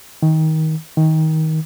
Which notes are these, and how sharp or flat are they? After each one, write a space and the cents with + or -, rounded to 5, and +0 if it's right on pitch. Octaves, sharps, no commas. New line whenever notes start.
D#3 +20
D#3 +20